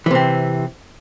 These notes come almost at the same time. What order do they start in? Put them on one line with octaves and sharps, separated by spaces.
E3 C3 C4